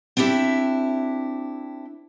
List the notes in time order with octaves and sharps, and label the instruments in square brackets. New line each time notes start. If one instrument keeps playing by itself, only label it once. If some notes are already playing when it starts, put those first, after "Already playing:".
[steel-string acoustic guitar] C4 D4 E4 G4 E5